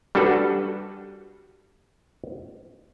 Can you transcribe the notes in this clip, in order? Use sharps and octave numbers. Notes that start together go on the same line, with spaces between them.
G3 D4 F#4 A4 B4